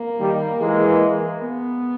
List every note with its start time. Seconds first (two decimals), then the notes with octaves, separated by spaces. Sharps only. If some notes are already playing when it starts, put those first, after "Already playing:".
Already playing: A#3
0.19 D#3 G3
0.59 E3 G#3
1.40 B3